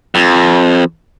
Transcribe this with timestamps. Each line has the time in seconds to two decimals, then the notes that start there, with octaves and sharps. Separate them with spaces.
0.15 F2